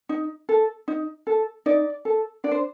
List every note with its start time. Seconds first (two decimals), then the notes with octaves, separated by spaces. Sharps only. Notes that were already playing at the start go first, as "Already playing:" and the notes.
0.09 D#4
0.49 A4
0.88 D#4
1.27 A4
1.66 D#4 D5
2.05 A4
2.44 D4 D5
2.51 C5